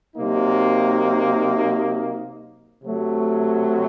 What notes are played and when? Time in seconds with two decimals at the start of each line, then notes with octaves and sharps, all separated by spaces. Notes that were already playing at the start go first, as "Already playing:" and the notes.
0.16 C3 F#3 A#3 D#4
2.83 C3 F#3 A3